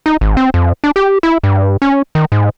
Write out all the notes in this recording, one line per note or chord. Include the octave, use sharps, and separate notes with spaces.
D#4
G#1
C4
F2
D4
G4
E4
G2
C#4
D#3
G#2